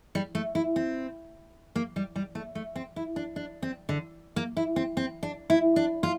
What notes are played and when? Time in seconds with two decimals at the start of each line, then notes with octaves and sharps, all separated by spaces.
0.15 G3
0.35 A3
0.55 E4
0.76 C4
1.76 A#3
1.96 G3
2.16 G3
2.35 A3
2.55 A3
2.76 C4
2.96 E4
3.16 D4
3.36 D4
3.62 C4
3.89 D3
4.36 A#3
4.57 E4
4.76 C4
4.97 C4
5.23 D4
5.50 E4
5.76 D4
6.03 F4